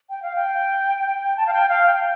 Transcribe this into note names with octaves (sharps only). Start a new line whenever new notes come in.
G5
F5
G5
A5
F5
G5
F5
G5